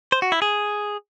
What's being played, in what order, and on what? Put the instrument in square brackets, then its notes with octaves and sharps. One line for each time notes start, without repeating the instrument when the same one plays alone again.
[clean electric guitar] C5
F#4
E4
G#4